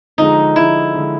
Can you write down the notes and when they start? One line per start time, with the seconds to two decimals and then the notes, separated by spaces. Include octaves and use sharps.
0.18 D3 F3 G#3 D#4
0.56 D3 F3 G#3 E4
0.95 D3 F3 G#3